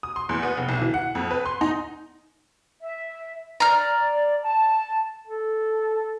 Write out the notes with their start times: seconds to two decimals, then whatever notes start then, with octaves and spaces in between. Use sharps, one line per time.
0.03 D#6
0.16 C6
0.29 E2
0.43 B3
0.57 F1
0.69 B1
0.82 E3
0.94 F#5
1.15 F2
1.31 B4
1.45 C6
1.61 D#4
2.81 E5
3.60 D5 A#5 F6
4.42 A5
5.27 A4